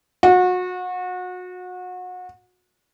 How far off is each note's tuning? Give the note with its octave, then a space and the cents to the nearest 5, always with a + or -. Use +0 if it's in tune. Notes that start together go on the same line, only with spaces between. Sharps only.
F#4 -30